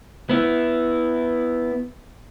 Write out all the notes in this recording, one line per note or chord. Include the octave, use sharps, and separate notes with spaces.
B3 E4